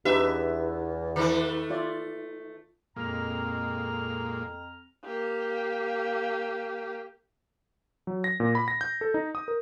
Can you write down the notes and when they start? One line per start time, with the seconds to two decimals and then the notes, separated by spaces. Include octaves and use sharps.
0.05 E2 D4 D#4 G4 B4 E5
1.16 D#3 A3
1.70 F4 D5 E5
2.96 F2 A#2 G#3 A#3 A#5 F6
5.05 A#3 G4
8.07 F#3
8.24 A#6
8.40 A#2
8.55 B5
8.68 A#6
8.81 G6
9.01 A4
9.14 D#4
9.35 D#6
9.48 A#4